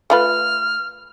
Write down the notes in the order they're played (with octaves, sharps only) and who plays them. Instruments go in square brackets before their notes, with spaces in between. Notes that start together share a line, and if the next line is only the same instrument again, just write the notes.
[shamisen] A3 F4 B4 [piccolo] F6